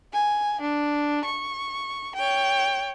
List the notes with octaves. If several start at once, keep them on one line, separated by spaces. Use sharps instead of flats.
G#5
D4
C#6
C#5 G5